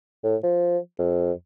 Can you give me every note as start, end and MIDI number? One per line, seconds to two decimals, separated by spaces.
0.24 0.36 45
0.43 0.78 53
0.99 1.32 41